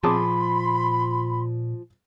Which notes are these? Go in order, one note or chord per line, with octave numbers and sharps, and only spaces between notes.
A#2 F3 G#4 A5 B5 C6 D6